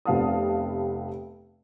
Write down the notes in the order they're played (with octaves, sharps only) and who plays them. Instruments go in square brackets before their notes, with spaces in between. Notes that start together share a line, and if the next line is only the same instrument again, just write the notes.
[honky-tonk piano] F1 C3 B3 F5 A5 D#6